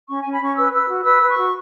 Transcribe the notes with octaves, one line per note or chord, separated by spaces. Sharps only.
C#4 C#6
C#4 G#5
B5
C#4 C#6
B4 E6
B4 E6
F#4
B4 E6
B4
C#6
F#4